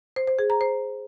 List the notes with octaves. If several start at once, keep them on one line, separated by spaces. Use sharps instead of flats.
C5
C5
G#4
A#5
C5